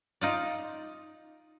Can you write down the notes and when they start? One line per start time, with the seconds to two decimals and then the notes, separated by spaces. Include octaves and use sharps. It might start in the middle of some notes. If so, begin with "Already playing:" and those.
0.21 D#4 F4 D5